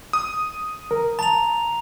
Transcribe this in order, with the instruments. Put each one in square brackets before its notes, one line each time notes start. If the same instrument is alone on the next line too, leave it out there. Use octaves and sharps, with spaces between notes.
[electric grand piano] D#6
[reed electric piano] A#4
[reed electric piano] A5 [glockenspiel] A#5 F7